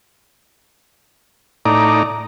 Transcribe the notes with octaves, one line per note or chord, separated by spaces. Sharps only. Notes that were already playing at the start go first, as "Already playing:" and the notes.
A2 D#4 D5 A#5